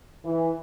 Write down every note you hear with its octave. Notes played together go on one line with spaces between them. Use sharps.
E3